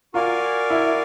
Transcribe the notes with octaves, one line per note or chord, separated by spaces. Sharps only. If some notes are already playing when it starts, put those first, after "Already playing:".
F4 F#4 A#4 D5 F5 G#5
E4